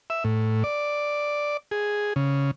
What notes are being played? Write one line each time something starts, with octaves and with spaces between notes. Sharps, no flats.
E5
A2
D5
G#4
C#3